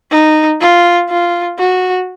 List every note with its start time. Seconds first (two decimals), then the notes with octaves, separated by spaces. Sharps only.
0.11 D#4
0.60 F4
1.09 F4
1.59 F#4